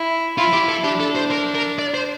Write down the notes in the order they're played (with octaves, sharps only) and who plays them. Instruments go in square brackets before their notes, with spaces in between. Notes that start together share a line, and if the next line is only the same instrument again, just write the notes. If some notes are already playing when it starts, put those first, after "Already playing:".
Already playing: [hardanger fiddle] E4
[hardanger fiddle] E4 [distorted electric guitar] F4
[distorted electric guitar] G4
A4
[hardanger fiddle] D4 [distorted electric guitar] G4
[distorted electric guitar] A4
C5
A#4
A#4
D5
C5